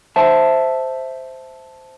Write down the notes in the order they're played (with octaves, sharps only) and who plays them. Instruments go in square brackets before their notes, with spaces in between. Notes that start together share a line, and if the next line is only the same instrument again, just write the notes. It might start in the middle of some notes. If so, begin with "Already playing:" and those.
[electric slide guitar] C5 E5 A5